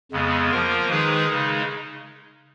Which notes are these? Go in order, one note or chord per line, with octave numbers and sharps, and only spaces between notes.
F2 C#3 G#3 B3
F3 A#3 F4 A#4
D#3 G#3 D#4 G#4 B4
C#3 G#3 D#4